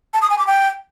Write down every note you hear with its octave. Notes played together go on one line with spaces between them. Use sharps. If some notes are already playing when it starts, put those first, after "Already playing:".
A5
D#6
G#5
D6
G5